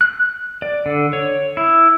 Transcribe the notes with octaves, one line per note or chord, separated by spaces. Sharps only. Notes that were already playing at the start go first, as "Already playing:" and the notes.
F#6
D5
D3
C#5
E4